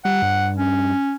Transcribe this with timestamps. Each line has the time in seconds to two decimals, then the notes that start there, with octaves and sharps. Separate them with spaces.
0.05 G3 F#5
0.22 G2
0.57 C#4